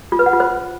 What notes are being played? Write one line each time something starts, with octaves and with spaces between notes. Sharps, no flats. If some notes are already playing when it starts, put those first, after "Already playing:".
F4
B4
F#5
F4
C5